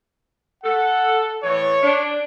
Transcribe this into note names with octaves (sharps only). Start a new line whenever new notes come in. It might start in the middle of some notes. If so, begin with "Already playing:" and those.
A4 F#5
A2 E3 C#5
D4